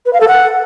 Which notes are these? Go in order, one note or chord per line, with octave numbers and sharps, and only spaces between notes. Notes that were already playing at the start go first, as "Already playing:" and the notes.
B4
F5
A4
F#5